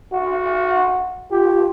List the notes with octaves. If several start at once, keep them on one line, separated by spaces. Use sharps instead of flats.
F#4
F4 G4